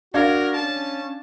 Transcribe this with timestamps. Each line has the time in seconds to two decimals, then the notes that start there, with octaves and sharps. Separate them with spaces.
0.14 D4 F#4 A#4 F5 G#6
0.55 C#4 A5